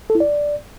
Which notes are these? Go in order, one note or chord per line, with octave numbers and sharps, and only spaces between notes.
A4
E4
D5